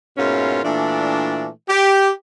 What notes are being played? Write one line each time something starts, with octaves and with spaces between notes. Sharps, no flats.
G#2 B2 A#3 C#4 E4 F4
A#2 E3 A3 D4
G4